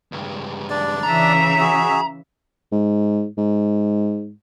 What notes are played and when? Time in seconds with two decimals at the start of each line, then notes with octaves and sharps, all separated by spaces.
0.12 C#2 G2
0.70 D4 D5
1.03 C#3 E3 E5 A#5
1.61 F#4 G#4
2.72 G#2
3.38 G#2